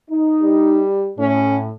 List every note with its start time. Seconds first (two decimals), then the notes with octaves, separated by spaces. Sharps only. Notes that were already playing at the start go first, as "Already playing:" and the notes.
0.11 D#4
0.42 G3
1.19 A2 C#4